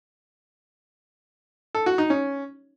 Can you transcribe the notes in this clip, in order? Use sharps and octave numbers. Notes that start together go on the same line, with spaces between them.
A4
F#4
D#4
C#4